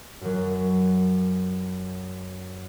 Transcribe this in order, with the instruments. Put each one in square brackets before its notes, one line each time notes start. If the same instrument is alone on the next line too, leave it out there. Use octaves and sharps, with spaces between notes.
[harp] F#2 F#3